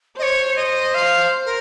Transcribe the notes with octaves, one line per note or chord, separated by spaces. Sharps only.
C5 C#5 D#5
D#5
F5
A#4